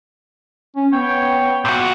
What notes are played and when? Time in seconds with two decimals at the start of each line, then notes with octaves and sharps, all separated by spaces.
0.76 C#4
0.92 B3 C#5 G5
1.65 A#2 F#4